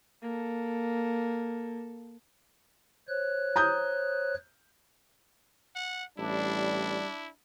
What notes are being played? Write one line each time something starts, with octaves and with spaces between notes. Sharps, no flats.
A#3 A4
C5 C#5 F#6
A#5 D#6 G6
F#5
A1 G3 D4 E4